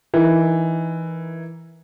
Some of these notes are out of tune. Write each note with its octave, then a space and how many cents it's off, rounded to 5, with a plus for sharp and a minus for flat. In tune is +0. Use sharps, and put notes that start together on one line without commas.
E3 +0 D#4 +0 A#4 +15